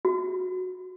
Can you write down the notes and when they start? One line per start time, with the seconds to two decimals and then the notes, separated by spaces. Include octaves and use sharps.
0.05 F#4